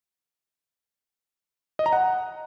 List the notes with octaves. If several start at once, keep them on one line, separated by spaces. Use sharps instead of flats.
D#5
A#5
F#5